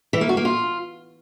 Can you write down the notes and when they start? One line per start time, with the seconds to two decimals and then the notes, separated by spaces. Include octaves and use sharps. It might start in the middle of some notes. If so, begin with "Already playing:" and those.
0.13 E3
0.21 A#3
0.29 F#4
0.37 A#3
0.45 F4